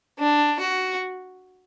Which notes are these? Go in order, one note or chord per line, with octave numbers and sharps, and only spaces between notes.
D4
F#4